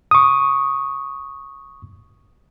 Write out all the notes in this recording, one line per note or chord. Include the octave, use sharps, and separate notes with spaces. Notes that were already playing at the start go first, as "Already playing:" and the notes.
C#6 D#6